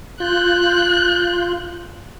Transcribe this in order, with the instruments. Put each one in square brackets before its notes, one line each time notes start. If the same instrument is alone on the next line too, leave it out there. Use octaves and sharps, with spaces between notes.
[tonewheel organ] F4 G6 [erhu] F#6